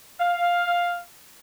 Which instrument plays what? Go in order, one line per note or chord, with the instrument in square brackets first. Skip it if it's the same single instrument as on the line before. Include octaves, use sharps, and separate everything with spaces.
[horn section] F5